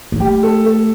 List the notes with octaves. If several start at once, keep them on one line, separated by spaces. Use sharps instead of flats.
A#3
A3 G4
A4
A4